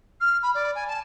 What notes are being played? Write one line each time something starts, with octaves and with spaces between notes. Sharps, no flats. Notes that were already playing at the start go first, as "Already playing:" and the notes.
F6
B5
D5
G#5
A5